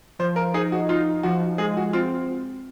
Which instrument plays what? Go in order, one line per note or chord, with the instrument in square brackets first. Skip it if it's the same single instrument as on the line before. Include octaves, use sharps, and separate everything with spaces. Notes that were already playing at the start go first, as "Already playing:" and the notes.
[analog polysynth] F3 [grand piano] C5
[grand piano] A#4
[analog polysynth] D#4 [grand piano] G#4
[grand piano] F#4
[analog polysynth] D#4 [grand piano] F4
[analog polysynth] F3 [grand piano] F#4
[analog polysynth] G#3 [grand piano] G#4
[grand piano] F#4
[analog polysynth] C4 [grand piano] F4